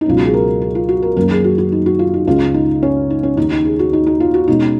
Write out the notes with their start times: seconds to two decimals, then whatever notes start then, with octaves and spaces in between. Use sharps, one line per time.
0.01 D#4
0.06 C#2 B2 F#3 C#4 F4
0.17 F#4
0.25 G#4
0.34 A#4
0.62 G#4
0.75 F4
0.89 F#4
1.02 A#4
1.17 F#2 D#3 A#3 C#4 A#4
1.31 G#4
1.44 F#4
1.58 F#4
1.72 D#4
1.86 F#4
1.99 F4
2.14 D#4
2.27 C#2 C#3 G#3 C#4 F4
2.54 D#4
2.83 C#4
3.10 D#4
3.23 C#4
3.37 D#2 D#3 A#3 C#4 D#4
3.51 D#4
3.65 G#4
3.79 F#4
3.93 D#4
4.07 D#4
4.20 F4
4.34 F#4
4.48 B2 G#3 C#4 D#4